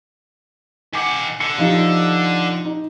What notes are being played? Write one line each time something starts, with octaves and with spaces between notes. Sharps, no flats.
D#3 F#5 G#5 D6
D3 C#7
F3 D#4 G4
D#4